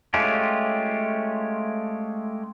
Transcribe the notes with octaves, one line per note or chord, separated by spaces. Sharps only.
G#3 A3 C#4 F4 G4